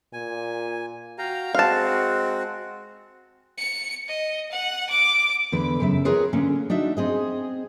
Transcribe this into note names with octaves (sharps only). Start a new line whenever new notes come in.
A#2 G#5
F#4 F5 G5 A#5
G#3 C4 F#4 F5 A5
C#7
D#5
F#5
D6
E2 D3 B4
F#2 C#3 E5
C4 F4 G#4 A#4 B4 C#5
D3 A#3 C#4
D4 D#4 F#4 E5
C4 G#4 D#5